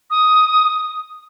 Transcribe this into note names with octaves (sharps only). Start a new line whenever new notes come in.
D#6